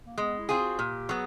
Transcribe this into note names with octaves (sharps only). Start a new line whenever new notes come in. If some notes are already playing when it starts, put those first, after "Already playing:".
A#3
G#3 B3
E4
C4 F4 G#4
F#4
A#2 G4
F#3 B3 G#4